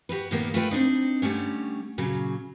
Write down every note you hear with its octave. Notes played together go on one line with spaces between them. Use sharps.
F#4 G4 A#4 B4
A#2 D#3 A#3 B3
A3 F4 B4 G5
C4 D4 D#4
D3 G3 A3 C#4
A#2 C#3 F#3